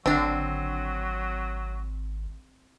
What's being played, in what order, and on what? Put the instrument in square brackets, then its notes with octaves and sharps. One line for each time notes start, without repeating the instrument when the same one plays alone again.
[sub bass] G#1 [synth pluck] D3 D4 [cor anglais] F#3 [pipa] C4